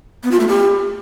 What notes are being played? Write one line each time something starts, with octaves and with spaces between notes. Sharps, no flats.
B3
F4
A3
G4